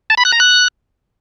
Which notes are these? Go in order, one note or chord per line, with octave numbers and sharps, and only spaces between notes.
A5
B5
F#6
A#5
F#6